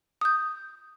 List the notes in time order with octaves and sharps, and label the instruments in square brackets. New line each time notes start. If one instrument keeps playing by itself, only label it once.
[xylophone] D#6 G6